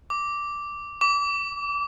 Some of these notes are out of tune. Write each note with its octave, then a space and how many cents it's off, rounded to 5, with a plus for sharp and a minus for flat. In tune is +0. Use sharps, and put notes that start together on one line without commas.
D6 -5
D6 -30